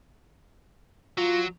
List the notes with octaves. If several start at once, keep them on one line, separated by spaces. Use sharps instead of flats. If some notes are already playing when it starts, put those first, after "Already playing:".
F#3 F4